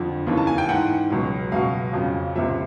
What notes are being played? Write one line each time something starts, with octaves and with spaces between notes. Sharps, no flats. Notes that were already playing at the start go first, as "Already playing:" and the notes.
Already playing: F2 D3 F3
D#2 C#3 E3
A5
G#5
G5
G#2 E3 F#5
C#2 B2 F#3
C#2 B2 F#3 F5
F2 C#3 F3
C#2 C3 F3 E5